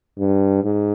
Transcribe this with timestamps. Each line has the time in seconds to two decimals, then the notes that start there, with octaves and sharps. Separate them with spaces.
0.18 G2
0.64 G#2